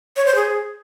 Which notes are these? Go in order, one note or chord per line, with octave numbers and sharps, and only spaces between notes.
C#5
C5
G#4